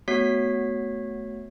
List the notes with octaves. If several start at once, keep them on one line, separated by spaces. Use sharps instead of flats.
A3 B3 F#4 C#5 B6 C7